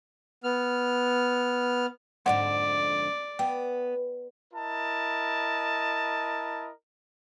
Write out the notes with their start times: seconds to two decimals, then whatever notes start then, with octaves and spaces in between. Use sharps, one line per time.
0.44 B3 F6
2.26 F2 G#2 D3 D5 F#5
3.39 B3 G5
4.54 E4 A#4 D#5 A5